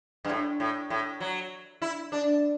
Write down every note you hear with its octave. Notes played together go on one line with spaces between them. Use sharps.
G2
A2
A2
A2
F#3
E4
D4